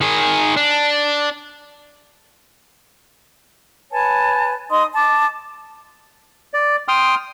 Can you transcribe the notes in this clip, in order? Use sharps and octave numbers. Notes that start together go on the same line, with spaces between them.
D#3 G#4
D4
B4 C#5 G#5 A5
D#4 D#5 C6 D#6
A5 D6
D5
G5 C6 D#6 F6